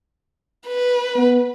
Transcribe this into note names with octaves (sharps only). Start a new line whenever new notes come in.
B4
B3